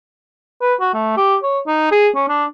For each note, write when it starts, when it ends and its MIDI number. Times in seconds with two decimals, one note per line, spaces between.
0.62 0.74 71
0.80 0.90 66
0.94 1.14 57
1.17 1.36 67
1.43 1.59 73
1.67 1.87 63
1.91 2.08 68
2.15 2.24 61
2.29 2.45 62